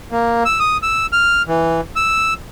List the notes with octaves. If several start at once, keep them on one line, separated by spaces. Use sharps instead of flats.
A#3
E6
D#6
E6
F6
E3
E6